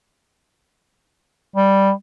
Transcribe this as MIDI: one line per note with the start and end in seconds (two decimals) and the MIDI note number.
1.56 1.91 55